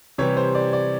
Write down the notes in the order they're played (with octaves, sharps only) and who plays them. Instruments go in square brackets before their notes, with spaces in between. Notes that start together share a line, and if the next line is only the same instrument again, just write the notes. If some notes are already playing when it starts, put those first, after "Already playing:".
[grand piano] C3 E3 G3 C#5
C5
D5
D5